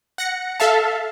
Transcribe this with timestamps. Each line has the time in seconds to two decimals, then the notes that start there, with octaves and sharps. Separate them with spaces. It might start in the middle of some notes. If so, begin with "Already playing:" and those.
0.18 F#5 A#6 C#7
0.60 A4 E5 F5 A5